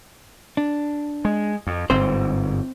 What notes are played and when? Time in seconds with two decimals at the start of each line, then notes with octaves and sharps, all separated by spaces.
0.57 D4
1.25 G#3
1.67 F2
1.90 G1 G#2 C4 C5